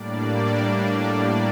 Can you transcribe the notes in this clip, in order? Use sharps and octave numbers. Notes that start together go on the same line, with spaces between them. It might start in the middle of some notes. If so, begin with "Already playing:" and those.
Already playing: A2 G3 A#3 D4 D5
D5